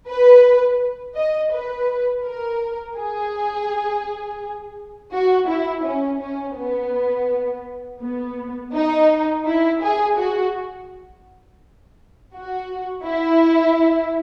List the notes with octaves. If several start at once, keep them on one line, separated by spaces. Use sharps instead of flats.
B4
D#5
B4
A#4
G#4
F#4
E4
C#4
C#4
B3
B3
D#4
E4
G#4
F#4
F#4
E4